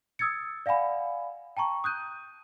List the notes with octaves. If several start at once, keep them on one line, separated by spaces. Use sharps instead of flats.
D#6 E6 G#6 A6 C#7
D5 F5 F#5 G#5 B5
G5 A5 A#5 C#6
D#6 F#6 G6 D#7